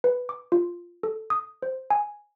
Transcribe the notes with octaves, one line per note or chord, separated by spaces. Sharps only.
B4
D6
F4
A4
D#6
C5
G#5